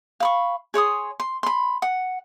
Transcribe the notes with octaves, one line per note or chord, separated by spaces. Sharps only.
F5 B5 C#6
G#4 C#5 C6 D#6
C6
B5 C6
F#5